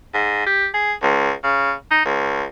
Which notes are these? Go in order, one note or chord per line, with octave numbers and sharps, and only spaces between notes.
G#2
G4
G#4
C#2
C#3
D#4
C#2